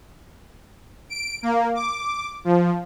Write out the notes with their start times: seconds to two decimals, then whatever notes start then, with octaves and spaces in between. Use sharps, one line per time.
1.09 D7
1.43 A#3
1.75 D6
2.45 F3